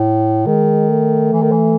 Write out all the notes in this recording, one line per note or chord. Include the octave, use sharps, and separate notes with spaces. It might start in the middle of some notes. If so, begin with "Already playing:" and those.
Already playing: A2
D#3 G#3
A3
E3
D#3
E3